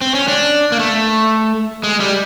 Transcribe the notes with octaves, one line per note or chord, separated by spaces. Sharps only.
C4
C#4
D4
A#3
A3
G#3
G3